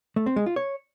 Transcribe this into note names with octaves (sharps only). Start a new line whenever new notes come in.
A3
C4
G#3
F4
C#5